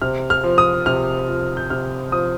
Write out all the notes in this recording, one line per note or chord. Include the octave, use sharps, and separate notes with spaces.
C3 F6
F6
F3
D#6
C3 F6
F3
G6
C3 F6
F3 D#6